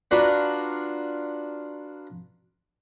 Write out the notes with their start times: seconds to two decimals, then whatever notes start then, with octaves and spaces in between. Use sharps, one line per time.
0.11 D4 F4 F#4 B4 A#5 C6